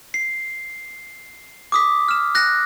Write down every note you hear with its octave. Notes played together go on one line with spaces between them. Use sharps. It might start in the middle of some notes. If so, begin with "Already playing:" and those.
C7
D6 D#6 B6
F6 E7
F#6 A#6